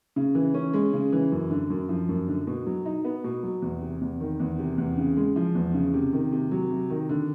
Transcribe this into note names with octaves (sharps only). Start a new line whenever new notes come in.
C#3
E3
C#4
G#3
C#3
E3
F#2
D3
F#2
F3
F#2
D3
B2
F#3
D#4
B3
B2
F#3
E2
C3
E2
D#3
E2
C3
E2
C#3
G#3
F3
E2
C#3
C3
D#3
C3
F#3
C3
D#3
D3